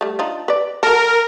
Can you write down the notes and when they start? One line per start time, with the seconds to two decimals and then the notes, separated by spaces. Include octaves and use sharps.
0.01 G3 A3
0.19 D4 D#4 F4
0.48 B4 D5
0.83 F#3 A4 A#4